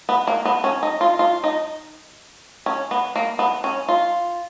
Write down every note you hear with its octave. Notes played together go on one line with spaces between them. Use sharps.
B3
A#3
B3
C#4
D#4
F4
F4
D#4
C#4
B3
A#3
B3
C#4
F4